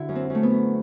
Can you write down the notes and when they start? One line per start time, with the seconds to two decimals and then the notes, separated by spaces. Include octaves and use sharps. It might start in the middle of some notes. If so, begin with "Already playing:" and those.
Already playing: D3 E4 F#4
0.09 F#2
0.15 C4
0.30 F#2 A3
0.43 B3
0.50 F#2